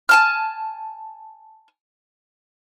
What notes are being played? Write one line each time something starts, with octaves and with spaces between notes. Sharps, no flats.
G#5 A5 F6